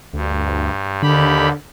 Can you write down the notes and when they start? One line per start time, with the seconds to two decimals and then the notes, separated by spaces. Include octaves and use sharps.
0.14 D2 G2
1.02 D#2 D3 G4 B5